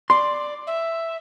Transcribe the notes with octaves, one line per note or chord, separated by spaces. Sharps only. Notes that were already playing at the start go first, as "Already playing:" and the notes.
D5 C6
E5